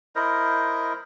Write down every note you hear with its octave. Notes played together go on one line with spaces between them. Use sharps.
E4 A#4 C5 D#5